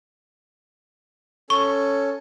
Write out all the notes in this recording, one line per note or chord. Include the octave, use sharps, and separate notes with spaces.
C#4 A4 C#6